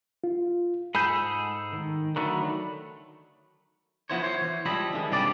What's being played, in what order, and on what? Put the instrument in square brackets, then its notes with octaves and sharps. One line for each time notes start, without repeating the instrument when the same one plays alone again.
[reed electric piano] F4
[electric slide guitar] G#2 G#4 A4 [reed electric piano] B5 G6
[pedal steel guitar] D#3
[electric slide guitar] D3 D#3 A3 [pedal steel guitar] F#3 B5
[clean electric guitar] F3 B3 E4 C5 C#5
C5 C#5
E3
C#2 F3 G3 E4 D#5 B5
D#3 F3 G#3
C2 G2 C#3 G3 D5